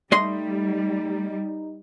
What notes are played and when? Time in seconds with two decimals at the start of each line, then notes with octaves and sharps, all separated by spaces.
0.12 G3 A3 D#4 D#5 C6